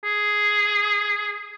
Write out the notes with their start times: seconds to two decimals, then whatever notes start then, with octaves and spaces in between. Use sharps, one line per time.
0.04 G#4